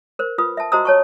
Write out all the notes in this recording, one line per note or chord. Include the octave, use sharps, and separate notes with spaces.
A#4 C5
F4 B4 D#6
E5 A5
F#4 C5 D#5 A#5 D#6 E6
C#5 A5 C#6